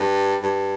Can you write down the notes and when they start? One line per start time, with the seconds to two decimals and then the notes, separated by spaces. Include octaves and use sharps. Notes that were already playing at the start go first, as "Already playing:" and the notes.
Already playing: G2
0.42 G2